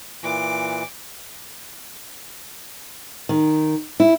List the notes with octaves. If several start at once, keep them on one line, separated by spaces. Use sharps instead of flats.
A#2 E3 D6
D#3
E4